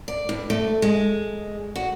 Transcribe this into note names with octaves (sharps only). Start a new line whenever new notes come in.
D5
G2
A3
G#3
F#4